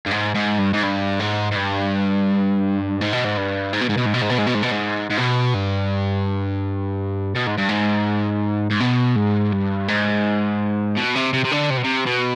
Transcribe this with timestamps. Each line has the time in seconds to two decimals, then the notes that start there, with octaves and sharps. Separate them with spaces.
0.06 G2
0.11 G#2
0.35 G#2
0.59 G2
0.74 G#2
0.84 G2
1.20 G#2
1.52 G#2
1.56 G2
3.01 G#2
3.13 B2
3.24 G#2
3.37 G2
3.73 G#2
3.81 B2
3.89 G#2
3.98 B2
4.06 G#2
4.14 B2
4.22 G#2
4.30 B2
4.38 G#2
4.47 B2
4.55 G#2
4.63 B2
4.71 G#2
5.10 G#2
5.18 B2
5.54 G2
7.35 B2
7.47 G#2
7.58 G2
7.69 G#2
8.71 G#2
8.80 B2
9.16 G#2
9.52 G2
9.88 G#2
10.97 B2
11.15 C3
11.33 C3
11.44 C3
11.51 D3
11.70 C3
11.77 B2
11.84 C3
12.06 B2